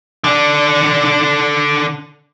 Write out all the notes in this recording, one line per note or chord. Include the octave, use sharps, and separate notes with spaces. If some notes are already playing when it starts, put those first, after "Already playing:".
D3 D4